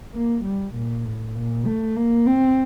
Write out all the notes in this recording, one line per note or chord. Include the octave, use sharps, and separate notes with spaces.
A#3
G3
A#2
A2
A#2
A3
A#3
C4